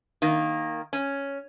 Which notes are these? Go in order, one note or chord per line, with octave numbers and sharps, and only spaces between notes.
D#3 A#3
C#4